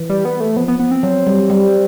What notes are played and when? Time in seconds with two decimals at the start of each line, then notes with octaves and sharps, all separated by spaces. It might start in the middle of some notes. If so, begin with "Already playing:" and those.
Already playing: E3
0.09 G3
0.25 B3
0.40 A3
0.56 F3 B3
0.68 B3
0.79 B3
0.91 C4
1.03 F#3
1.27 G3
1.50 G3